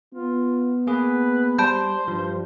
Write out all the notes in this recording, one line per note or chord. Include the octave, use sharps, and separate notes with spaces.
B3 F4
A#3 G#4 B4
G3 C5 A5 B5 G6
G2 F3